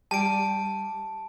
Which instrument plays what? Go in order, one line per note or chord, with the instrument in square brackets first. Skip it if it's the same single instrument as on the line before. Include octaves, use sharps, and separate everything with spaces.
[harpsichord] G3 [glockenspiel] A5 D7